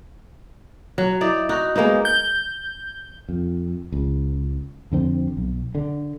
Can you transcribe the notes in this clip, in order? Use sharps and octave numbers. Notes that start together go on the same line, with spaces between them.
F#3
D#4 E4 D5
D#4 F#4
G#3 A#3 B3 D#4
G6
F2
C#2
F2 D3 C4
B1
D3